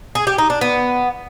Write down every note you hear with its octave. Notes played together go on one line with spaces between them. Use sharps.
G#4
G4
D#4
D4
B3